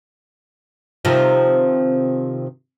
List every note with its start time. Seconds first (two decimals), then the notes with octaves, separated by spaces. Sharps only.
1.05 C3 D#3 F3